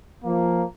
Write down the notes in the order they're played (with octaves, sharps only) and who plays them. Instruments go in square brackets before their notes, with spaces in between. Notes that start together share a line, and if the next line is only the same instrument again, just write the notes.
[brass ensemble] F3 A#3